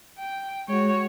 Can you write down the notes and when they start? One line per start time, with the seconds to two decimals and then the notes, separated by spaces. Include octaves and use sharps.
0.19 G5
0.69 G#3 F#4 C#5